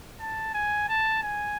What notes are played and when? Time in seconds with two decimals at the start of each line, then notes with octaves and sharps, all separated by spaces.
0.20 A5
0.54 G#5
0.89 A5
1.23 G#5